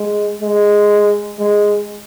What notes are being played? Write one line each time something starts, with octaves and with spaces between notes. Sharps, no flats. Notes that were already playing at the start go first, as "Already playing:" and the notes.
Already playing: G#3
G#3
G#3